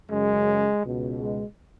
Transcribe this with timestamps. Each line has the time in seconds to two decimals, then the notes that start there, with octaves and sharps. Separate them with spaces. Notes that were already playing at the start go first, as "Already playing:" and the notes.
0.10 F#2 C#3 G#3
0.84 C#2 B2
1.20 G#3